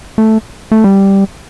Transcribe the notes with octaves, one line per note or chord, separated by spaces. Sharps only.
A3
A3
G3